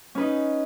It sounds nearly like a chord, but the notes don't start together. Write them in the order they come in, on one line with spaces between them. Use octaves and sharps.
C#4 B4 D#4